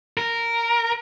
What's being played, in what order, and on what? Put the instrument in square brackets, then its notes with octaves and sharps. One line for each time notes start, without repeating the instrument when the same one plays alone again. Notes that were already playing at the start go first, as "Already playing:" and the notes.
[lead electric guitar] A#4